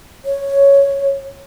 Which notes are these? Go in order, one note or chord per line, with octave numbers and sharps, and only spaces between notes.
C#5